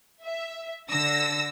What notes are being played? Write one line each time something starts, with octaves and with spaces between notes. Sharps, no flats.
E5
D3 E6 A#6